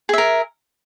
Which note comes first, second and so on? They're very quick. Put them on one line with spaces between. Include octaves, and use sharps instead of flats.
G#4 E5 A#4